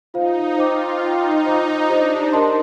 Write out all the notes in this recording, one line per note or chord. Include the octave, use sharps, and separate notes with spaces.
D#4 F4 C5 F5
F4 C5 G5 D6
D#4 C5 D#5 G5
F4 C5 D#5 A#5 D6
D4 G4 C5 D#5
A#4 D#5 A5 C6